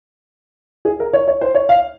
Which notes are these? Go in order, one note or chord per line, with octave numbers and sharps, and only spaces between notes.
G#4
A#4
C#5
C#5
C5
C#5
F5